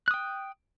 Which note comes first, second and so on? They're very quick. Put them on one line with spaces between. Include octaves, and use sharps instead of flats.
F#6 D#6 G5